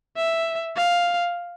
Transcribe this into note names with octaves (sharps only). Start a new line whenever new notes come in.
E5
F5